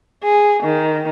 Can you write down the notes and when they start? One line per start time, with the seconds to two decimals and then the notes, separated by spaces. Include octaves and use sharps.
0.23 G#4
0.63 D#3